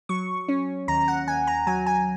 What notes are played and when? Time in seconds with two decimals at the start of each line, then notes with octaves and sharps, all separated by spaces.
0.09 F#3 C#6
0.49 C#4
0.88 D#2 A#5
1.08 F#5
1.27 D#2 G#5
1.47 A#5
1.67 F#3 G#5
1.86 G#5